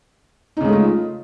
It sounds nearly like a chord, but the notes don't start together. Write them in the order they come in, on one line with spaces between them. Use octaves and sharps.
D#4 C#3 G#3 A3 F4